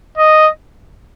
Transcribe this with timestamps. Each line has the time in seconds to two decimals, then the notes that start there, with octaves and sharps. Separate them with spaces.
0.18 D#5